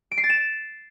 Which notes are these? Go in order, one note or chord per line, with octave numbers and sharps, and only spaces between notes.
D7
C7
A6
E7